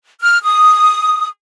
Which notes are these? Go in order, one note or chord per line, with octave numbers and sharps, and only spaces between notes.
F6
D#6